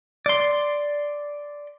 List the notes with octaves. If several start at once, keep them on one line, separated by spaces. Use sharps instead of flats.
D5 C6